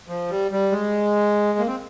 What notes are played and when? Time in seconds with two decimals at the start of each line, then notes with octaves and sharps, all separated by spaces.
0.08 F3
0.30 G3
0.51 G3
0.72 G#3
1.59 A#3
1.67 C4